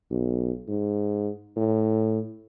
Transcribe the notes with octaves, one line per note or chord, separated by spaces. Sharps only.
B1
G#2
A2